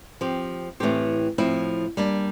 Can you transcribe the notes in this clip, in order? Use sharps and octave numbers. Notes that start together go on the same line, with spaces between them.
F3 C4 G4
A2 E3 A3 C4 G4
A2 F3 C4 E4
G3 A#3 D4